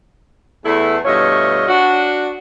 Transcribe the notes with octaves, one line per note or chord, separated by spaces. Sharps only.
E2 A3 E4
G2 B2 A3 F4 C#5 D#5
D4 F#4